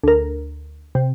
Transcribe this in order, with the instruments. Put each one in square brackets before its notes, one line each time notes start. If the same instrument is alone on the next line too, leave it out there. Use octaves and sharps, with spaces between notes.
[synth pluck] D2 A#4
C3